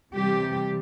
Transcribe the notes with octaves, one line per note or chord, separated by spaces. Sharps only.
C3 E3 G3 G4